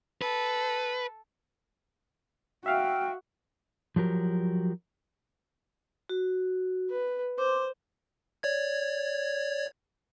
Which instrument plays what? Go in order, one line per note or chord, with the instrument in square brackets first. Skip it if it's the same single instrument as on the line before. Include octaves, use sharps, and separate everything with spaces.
[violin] A4 [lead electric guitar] B4
[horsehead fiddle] F#4 [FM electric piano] E5 F5 [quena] G5
[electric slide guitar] F3 F#3 G4 A#4
[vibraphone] F#4
[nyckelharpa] B4
[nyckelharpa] C5 [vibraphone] C6 D6
[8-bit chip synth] C#5 D5 G#6